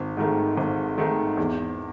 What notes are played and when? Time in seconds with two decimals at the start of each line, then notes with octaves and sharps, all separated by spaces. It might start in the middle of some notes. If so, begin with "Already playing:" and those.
Already playing: G#1
0.17 G#2 D#3 A3
0.57 G#1
0.97 G#2 D#3 A3
1.37 E2